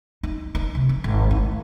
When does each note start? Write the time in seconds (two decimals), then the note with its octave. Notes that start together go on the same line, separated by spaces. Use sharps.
0.23 D#4
0.55 D#4
0.75 C3
0.89 F3
1.04 G#1
1.31 A2